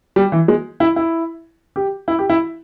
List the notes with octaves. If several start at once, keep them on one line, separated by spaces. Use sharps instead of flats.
G3
E3
G#3
E4
E4
G4
E4
G4
E4